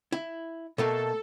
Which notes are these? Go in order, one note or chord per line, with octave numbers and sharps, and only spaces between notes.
E4
B2 A3 A#3 A4